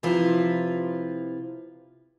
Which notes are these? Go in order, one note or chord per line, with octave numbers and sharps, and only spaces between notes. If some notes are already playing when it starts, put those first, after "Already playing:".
C3 F3 E4 F4 B4